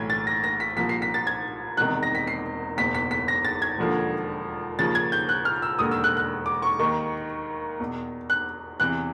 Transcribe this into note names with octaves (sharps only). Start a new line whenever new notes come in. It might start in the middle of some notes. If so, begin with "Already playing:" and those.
Already playing: B1 A2 E3 G#6
A6
A#6
A#6
B6
C2 A#2 F3 B6
C7
B6
A6
G#6
E1 E2 C3 D#3 F#6
A#6
B6
C7
F#1 E2 B2 B6
B6
B6
A#6
A6
G#6
E1 D#2 D3 F3
D#2 C#3 F3 A6
G#6
G6
F#6
F6
E6
E1 D#2 D3 D#6
E6
F#6
F#6
D6
C#6
D#2 D#3 C#6
E2 B2
F#6
E2 C3 E3 F#6